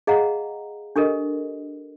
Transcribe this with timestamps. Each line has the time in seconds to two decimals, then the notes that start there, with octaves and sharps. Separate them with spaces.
0.07 G#4 D#5 F5 F#5 A#5
0.96 D4 G4 A4 A#4 D#5